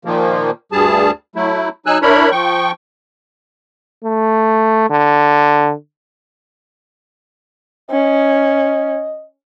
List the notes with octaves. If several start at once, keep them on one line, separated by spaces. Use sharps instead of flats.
A#2 D#3 F3 A#3
D2 G2 G3 G#4 A5
F#3 A3 E4
F#3 D#4 G#5 E6 F#6
D4 E4 A#4 C#5 B5
F3 G5 C#6
A3
D3
C#4 D#5